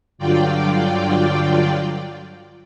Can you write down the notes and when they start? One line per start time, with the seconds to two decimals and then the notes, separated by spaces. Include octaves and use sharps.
0.18 G2 D3 F#3 F4 D5 G5